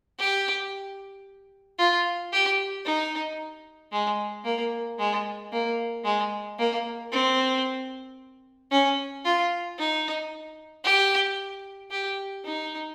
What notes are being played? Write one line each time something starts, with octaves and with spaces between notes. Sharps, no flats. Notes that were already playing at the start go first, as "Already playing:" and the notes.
G4
F4
G4
D#4
G#3
A#3
G#3
A#3
G#3
A#3
C4
C#4
F4
D#4
G4
G4
D#4